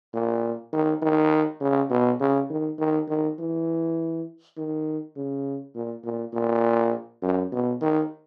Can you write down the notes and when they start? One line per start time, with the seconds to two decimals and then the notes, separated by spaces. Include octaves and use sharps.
0.14 A#2
0.73 D#3
1.02 D#3
1.61 C#3
1.90 B2
2.20 C#3
2.50 D#3
2.79 D#3
3.09 D#3
3.39 E3
4.57 D#3
5.16 C#3
5.75 A#2
6.04 A#2
6.34 A#2
7.22 F#2
7.52 B2
7.81 D#3